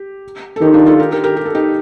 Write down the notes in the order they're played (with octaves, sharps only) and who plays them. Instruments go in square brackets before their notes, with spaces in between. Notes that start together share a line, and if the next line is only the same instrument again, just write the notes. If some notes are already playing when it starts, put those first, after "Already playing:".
Already playing: [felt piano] G4
A4
[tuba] D#3 [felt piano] D#4 G4
[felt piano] D4 F4
F4 A4
G4 A#4
G4 A#4
G4 A#4
G4
A4
D#4 G4